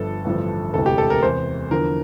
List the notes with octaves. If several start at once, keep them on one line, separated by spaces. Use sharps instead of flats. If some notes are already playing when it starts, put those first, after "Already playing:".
Already playing: G1 G2 F3 A4
A1 G2 D3 F3
E1 D2 C3 E3 A4
G4
A4
A#4
E2 C3 E3 C5
E2 D3 F3 A#4